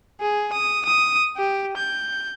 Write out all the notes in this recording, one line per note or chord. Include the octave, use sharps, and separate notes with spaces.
G#4
D#6
D#6
G4
G6